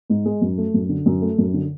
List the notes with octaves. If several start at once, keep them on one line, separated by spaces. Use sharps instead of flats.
G#2
G#3
F#2
A3
F#2
D3
F#2
A3
F#2
D3